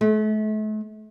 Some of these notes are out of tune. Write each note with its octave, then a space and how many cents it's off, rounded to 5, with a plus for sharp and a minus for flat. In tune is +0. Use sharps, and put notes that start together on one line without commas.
A3 -40